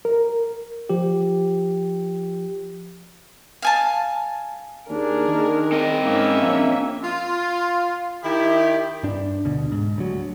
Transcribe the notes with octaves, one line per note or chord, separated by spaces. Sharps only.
A#4
F3 G4
F5 G#5 A5
D#2 D4 G#4 A#4
D#3
C4 D#5
G#2 A#3 C#4 E5
A#1 A#3
F4
D#3 E4 G4
G2 D4
D2 B2 D3
G#2
D1 D2 F#3